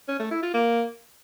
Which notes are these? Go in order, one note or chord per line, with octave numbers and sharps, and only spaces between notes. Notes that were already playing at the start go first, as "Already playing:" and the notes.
C#4
A3
E4
F4
A#3